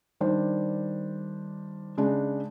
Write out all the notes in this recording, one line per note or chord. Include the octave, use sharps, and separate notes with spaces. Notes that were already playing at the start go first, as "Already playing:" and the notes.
D#3 G3 D4 C5
C#3 G#3 D4